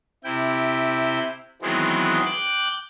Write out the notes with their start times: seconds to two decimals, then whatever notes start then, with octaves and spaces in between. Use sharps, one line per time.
0.24 C3 E4 G5
1.62 D#3 E3 F#3 G#3 B3 C4
2.25 G5 D6 F#6 G6